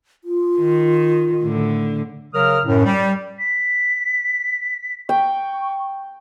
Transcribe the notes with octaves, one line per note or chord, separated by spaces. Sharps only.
F4
D#3
A2 D3
C#3 F#3 A#4 D#6 F6
F#2 A2
G3
B6
G5 C#6